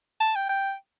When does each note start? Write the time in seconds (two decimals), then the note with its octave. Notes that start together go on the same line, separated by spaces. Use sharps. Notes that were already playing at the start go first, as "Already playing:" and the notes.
0.21 A5
0.35 G5
0.49 G5